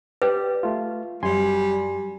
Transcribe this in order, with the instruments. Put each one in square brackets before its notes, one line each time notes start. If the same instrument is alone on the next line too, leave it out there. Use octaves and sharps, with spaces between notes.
[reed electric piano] G4 D5 [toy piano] B4
[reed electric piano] A3 F4
[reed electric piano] F#2 G#5 C6 [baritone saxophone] G3